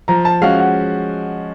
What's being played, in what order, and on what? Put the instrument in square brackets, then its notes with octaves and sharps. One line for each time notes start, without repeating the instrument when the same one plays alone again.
[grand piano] F3 [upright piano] A#5
[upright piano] A5
[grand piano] G#3 C#4 F#4 [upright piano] F5
[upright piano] F#5